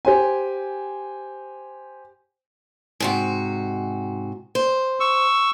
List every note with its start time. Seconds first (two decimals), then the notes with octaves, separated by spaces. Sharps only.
0.05 G4 C5 G#5
3.00 G#2 C3 F#4
4.55 C5
5.00 C#6 E6